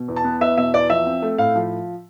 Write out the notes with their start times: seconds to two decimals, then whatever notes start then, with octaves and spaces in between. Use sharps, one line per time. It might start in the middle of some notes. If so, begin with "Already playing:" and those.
Already playing: B2
0.08 E2
0.16 A5
0.24 B3
0.41 E2 E5
0.57 B2 E5
0.73 E2 D5
0.89 F3 E5
1.06 C4
1.22 A3
1.38 A2 F5
1.55 F3